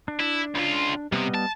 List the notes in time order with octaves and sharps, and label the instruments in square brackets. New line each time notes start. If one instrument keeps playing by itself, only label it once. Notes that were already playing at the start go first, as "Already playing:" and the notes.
[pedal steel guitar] D4
[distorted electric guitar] E4
C#2 F4
[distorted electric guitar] C3 [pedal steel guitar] G3 B3 D#5
[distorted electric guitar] A5